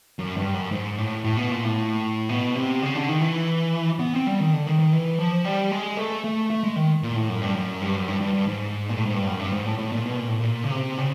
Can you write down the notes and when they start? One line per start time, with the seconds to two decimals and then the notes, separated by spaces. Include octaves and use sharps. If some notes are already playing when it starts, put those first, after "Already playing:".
0.19 F#2
0.37 G2
0.54 F#2
0.71 G#2
0.98 A2
1.24 A2
1.37 B2
1.51 A#2
1.64 A2
2.29 B2
2.55 C3
2.82 C#3
2.95 D3
3.09 D#3
3.21 E3
4.00 B3
4.14 C4
4.27 G3
4.40 D#3
4.53 D3
4.67 D#3
4.79 D#3
4.93 E3
5.19 F3
5.45 G3
5.71 G#3
5.97 A3
6.24 A3
6.50 A3
6.63 G#3
6.76 D#3
7.03 A#2
7.16 A2
7.29 F#2
7.42 G2
7.55 F#2
7.82 G2
7.96 F#2
8.08 G2
8.21 G2
8.34 G2
8.47 G#2
8.89 A#2
8.98 A2
9.05 G#2
9.14 G2
9.27 F#2
9.40 G2
9.52 G#2
9.66 A2
9.79 A2
9.92 A#2
10.06 B2
10.16 A#2
10.28 A2
10.39 A#2
10.64 C#3
10.71 C3
10.98 C#3